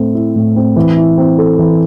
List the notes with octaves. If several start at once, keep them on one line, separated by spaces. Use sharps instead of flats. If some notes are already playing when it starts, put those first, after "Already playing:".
Already playing: A2 A3 C4
E4
A2
C4
E3
E4
C4
A4
E3